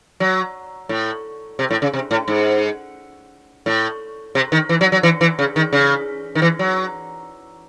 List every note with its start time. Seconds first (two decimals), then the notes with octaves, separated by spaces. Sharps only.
0.20 F#3
0.89 A2
1.59 C3
1.71 A2
1.82 C#3
1.93 C3
2.11 A2
2.28 G#2
3.66 A2
4.35 C3
4.52 D#3
4.69 E3
4.81 F#3
4.92 F#3
5.03 E3
5.21 E3
5.39 C#3
5.56 D#3
5.73 C#3
6.35 D#3
6.42 E3
6.59 F#3